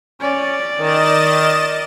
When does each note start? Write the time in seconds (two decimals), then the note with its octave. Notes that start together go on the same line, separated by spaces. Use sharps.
0.21 C#4 D5
0.79 D#3 D#5 A6 E7